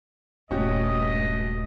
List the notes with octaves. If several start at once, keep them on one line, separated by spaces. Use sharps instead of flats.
D#1 G2 A3 C#4 F#4 G4 D#5